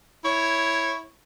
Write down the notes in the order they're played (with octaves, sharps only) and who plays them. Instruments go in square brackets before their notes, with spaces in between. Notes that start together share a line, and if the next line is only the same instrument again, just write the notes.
[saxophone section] E4 C#5